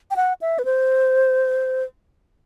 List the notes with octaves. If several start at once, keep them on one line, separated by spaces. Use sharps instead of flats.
G5
F#5
E5
B4
C5